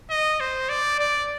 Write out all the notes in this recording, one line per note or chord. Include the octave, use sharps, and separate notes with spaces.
D#5
C5
D5
D5